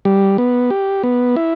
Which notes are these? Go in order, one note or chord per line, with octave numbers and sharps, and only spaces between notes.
G3
B3
G4
B3
E4